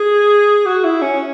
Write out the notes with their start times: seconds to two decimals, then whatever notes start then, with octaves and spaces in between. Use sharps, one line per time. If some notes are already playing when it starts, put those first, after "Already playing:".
Already playing: G#4
0.66 F#4
0.84 E4
1.02 C#4